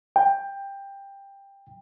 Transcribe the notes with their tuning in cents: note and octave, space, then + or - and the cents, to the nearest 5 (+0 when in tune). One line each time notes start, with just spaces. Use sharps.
G5 +15